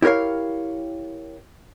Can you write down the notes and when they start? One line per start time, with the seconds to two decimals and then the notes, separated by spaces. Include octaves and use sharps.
0.02 E4 G4 A#4 C#5 F5